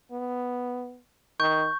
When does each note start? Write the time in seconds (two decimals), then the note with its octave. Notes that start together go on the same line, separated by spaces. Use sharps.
0.12 B3
1.40 D#3 C#6 G6